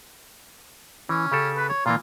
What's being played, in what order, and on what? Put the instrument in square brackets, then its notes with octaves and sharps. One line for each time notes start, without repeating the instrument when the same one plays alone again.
[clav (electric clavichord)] E3 [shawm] C#4
[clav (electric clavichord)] C#3 G4 A4
[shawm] B4
C#5
[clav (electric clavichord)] A#2 E3 A#3 [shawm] F4